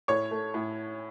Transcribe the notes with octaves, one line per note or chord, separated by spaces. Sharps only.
A2 C#5 C#6
A3
A2